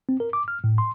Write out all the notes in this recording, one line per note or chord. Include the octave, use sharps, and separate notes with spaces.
C4
A#4
D6
F6
A2
C6